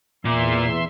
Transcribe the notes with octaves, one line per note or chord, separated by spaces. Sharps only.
E2 A#2 E5 C6